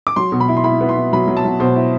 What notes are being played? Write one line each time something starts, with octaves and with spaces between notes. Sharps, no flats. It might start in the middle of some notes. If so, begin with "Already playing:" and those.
D6
F#3 C6
B2
B5
E4
C6
E4 B5
B3
C6
E4
F#3 B5
F#3
A5
F#3
B2 C5
E4